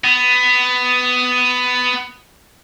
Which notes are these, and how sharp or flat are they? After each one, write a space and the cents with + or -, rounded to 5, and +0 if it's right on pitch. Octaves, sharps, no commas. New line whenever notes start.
B3 +15